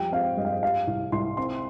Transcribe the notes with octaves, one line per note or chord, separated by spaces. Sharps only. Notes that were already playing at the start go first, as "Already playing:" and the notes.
Already playing: F2 G3 G5
C4 F5
G2 D#5
F5
D#5
G3 F5
C2
C2 C6
C4 C6